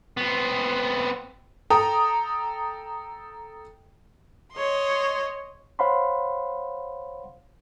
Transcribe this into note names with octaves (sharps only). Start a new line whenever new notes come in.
B3 C4
A4 G5 A#5 D#6
C#5 D#5 C6
C5 C#5 F5 F#5 B5 C6